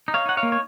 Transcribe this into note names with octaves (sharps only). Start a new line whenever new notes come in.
D#4
C#5 F5
D#4 F#5
C#5 F5
A#3
C#5